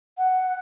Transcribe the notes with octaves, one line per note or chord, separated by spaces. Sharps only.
F#5